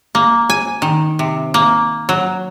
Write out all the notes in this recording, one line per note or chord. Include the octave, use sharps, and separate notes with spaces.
A#3
G#5
D#3
C3
A#3
F#3